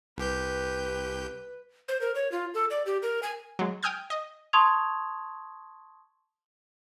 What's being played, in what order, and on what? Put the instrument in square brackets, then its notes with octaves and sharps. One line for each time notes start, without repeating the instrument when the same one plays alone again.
[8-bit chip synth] C2 G4 G6 [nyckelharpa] B4
[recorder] C5
A#4
C#5
F4
A4
D5
G4
A#4
G#5
[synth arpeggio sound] F#3 G#3
G5 G#5 D#6 F6 G6 G#6
D#5
[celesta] A5 C6 C#6 D#6 G#6 F7